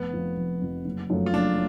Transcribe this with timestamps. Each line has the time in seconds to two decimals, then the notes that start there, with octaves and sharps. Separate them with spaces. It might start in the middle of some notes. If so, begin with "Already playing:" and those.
Already playing: F1 B3
0.13 F2 F3
0.37 F1
0.61 F2 F3
0.85 F#1
1.10 F#2 F3 A3
1.26 F4
1.34 F#1 D4